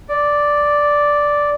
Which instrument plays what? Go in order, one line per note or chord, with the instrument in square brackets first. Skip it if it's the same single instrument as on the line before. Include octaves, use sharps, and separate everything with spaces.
[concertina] D5